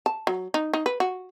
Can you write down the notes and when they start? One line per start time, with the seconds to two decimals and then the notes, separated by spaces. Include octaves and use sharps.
0.06 A5
0.27 F#3
0.54 D#4
0.73 D#4
0.86 B4
1.00 F#4